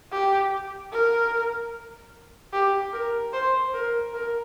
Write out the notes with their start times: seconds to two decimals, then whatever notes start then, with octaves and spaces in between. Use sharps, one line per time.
0.12 G4
0.93 A#4
2.53 G4
2.93 A#4
3.33 C5
3.74 A#4
4.14 A#4